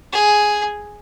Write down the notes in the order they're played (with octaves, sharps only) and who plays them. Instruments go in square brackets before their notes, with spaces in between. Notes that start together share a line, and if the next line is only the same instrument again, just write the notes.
[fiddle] G#4